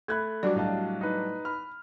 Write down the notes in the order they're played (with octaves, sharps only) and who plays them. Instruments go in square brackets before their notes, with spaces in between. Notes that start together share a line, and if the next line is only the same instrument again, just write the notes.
[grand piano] A3 [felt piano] B5 F#6 G#6
[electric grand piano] F#3 G3 D4 [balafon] F#4 D5
[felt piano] A2 [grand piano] D#5 F5 A5
[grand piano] D#4 B4
[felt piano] B5 [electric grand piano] F6